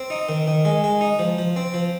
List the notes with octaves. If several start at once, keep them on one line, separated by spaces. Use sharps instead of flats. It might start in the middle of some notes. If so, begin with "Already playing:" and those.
Already playing: C4
D#4
D#3
D#3
G#3
G#3
D#4
F3
F3
C4
F3